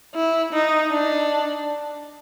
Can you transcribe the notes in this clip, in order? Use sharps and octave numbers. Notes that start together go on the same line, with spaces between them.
E4
D#4
D4